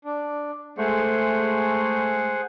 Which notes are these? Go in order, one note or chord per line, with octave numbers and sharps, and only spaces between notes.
D4
G#3 A3 G#4 C5 F#5